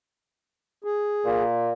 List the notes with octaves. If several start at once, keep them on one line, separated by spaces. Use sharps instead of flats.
G#4
A#2